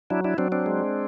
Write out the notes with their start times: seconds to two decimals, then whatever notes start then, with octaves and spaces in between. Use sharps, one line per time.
0.10 F#3 D4 E4
0.24 D4 E4
0.38 F#3 C4 D4
0.52 C4 D4
0.66 G#3